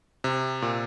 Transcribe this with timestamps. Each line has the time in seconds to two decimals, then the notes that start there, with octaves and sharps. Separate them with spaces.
0.24 C3
0.62 A#2